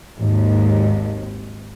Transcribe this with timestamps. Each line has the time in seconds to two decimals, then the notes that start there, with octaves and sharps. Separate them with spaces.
0.18 G#1 D#2